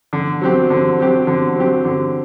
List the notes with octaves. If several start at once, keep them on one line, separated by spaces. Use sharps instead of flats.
D3
F#3 C4 G4
D3
F#3 C4 G4
D3
F#3 C4 G4
D3